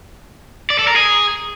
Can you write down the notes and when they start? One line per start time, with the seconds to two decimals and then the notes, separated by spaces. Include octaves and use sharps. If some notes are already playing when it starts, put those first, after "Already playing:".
0.70 D5
0.79 A4
0.87 A#4
0.96 G#4